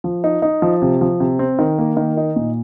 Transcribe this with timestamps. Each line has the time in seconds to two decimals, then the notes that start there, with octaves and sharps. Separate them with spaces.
0.04 F3
0.24 D#4
0.42 D#4
0.62 F3
0.82 C3
1.01 F3
1.20 C3
1.39 C4
1.59 D#3
1.79 A#3
1.97 D#3
2.17 D#4
2.36 A#2